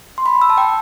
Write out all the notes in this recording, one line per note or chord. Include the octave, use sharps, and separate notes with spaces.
C6
B5
E6
A5
G5